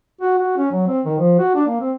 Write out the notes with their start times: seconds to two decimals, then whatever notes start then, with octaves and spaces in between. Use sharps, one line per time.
0.21 F#4
0.38 F#4
0.57 C#4
0.71 F#3
0.87 C4
1.05 D#3
1.18 F3
1.39 F#4
1.55 D4
1.67 A#3
1.80 C4